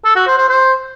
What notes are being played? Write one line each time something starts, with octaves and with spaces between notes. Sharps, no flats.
A4
F#4
C5
C5
C5